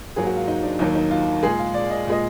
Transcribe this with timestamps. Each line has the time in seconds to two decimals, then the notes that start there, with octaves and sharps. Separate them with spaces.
0.16 G#2 F#3 A#3 G#4
0.27 F#4
0.37 F4
0.48 D#4
0.63 D4
0.79 D#2 D#3 F#3 A#3 D#4
0.95 D#4
1.11 F4
1.43 A#2 G#3 G#4
1.59 F4
1.74 D5
1.90 D#5
2.07 A#2 G#3 D#5